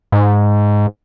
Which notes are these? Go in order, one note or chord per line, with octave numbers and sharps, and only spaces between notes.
G#2